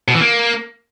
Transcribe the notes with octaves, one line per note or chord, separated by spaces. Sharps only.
B2
E3
A#3